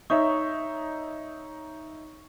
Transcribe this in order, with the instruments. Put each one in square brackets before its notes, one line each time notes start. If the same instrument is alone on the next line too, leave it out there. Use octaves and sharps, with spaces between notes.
[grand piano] D#4 C#5 E5 [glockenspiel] C#6